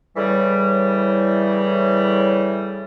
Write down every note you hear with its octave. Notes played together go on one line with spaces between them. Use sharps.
A2 C#3 E3 G3